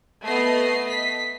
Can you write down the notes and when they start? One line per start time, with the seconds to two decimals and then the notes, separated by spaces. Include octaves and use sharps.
0.24 A3 B3 D#5 C7
0.89 B6